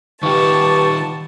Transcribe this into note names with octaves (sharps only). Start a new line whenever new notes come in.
D#3 F4 G4 B4 A5 C#6